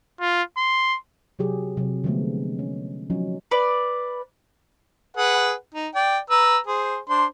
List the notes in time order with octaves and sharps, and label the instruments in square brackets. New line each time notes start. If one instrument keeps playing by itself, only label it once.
[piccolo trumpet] F4
C6
[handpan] C3 F#3 G4 G#4
C3 F#3
D3 F3 G#3 A3 B3 C4
C#4
F3 F#3 C#4 D#4
[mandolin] B4 D5
[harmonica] G#4 B4 F#5
D#4
D5 G5
B4 A#5 E6
G#4 C5
D4 C5 C6